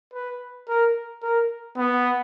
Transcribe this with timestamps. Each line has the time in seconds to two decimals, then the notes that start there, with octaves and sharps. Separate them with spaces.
0.14 B4
0.69 A#4
1.23 A#4
1.78 B3